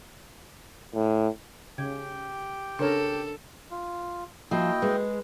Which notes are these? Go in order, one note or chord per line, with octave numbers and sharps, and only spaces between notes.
A2
C#3 G4 G5 G#6
C#3 D4 A4 A#4 C#5
F4
F3 A#3 E4 F#4 D#5 G5
G#3 B4